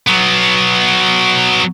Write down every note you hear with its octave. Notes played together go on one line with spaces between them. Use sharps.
F#3 B3